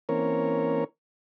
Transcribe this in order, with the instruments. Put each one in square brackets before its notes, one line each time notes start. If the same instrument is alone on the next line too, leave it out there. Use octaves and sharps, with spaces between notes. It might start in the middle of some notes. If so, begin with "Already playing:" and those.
[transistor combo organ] E3 A#3 C4 C#4 A#4 C#5